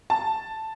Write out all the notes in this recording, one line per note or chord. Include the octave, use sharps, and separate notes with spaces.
A5